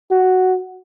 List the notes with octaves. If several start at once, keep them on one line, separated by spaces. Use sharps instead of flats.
F#4